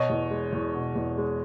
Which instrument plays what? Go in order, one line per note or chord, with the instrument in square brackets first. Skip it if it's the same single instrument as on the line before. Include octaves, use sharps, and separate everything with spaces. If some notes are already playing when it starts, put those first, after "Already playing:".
Already playing: [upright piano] B2 C#5 D#5
E2
G#3
E2
B2
E2
G#3